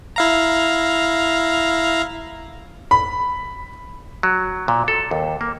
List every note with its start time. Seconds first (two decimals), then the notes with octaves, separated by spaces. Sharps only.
0.16 E4 F5 A#5
2.91 B5
4.23 F#3
4.68 A#2
4.88 A4
5.11 D#2
5.41 A#3